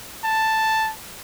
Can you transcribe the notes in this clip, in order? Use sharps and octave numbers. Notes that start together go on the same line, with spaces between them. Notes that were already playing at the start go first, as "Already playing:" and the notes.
A5